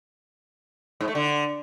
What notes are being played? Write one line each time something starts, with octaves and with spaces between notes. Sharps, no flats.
G#2
A3
D3